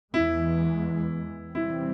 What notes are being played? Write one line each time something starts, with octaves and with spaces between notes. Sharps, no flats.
E2 E3 G#3 E4
C3 E3 G3 C4 E4